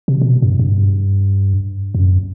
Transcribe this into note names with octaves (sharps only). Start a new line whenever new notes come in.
C3
C3
B2
G2
G2
F#2